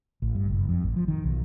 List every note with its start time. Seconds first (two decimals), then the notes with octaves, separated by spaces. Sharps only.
0.22 A1
0.35 G2
0.48 F#1
0.69 F2
0.83 A1
0.96 F3
1.08 D#3
1.24 B1